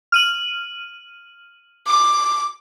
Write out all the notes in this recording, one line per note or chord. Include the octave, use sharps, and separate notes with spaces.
F6 D#7 F#7
D6